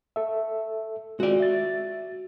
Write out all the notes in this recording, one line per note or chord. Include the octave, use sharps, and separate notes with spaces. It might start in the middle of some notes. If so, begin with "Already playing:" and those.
A4 E5
G#3 C4 F4 F#4 D5
E5 A6